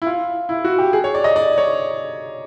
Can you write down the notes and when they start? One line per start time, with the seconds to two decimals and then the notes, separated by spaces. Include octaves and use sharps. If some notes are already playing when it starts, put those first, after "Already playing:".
0.02 E4
0.07 F4
0.49 E4
0.65 F#4
0.78 G4
0.93 G#4
1.04 C#5
1.15 D5
1.24 D#5
1.36 D5
1.58 C#5